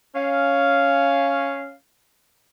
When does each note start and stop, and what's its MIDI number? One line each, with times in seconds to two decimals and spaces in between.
0.15 1.73 61
0.15 1.73 77